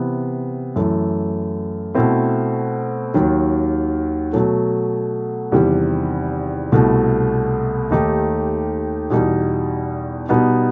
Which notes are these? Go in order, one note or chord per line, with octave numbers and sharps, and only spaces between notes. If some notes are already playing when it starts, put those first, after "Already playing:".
Already playing: C3 E3 B3
F#2 E3 A3
B2 A3 C4 E4
D#2 D#3 F#3
B2 F#3 A3
E2 C3 D#3 G3
C2 B2 A3
D#2 D#3 A3 D#4 G4
E2 B2 G3 D#4
B2 G3 B3 D#4